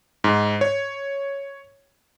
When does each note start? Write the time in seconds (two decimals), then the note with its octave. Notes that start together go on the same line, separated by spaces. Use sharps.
0.24 G#2
0.61 C#5